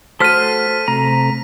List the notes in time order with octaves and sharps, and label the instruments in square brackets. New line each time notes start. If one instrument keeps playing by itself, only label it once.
[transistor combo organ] A3 F#4 [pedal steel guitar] A4 C5 F6 [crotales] B6 D#7
[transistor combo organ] C3 A3 [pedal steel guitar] A#5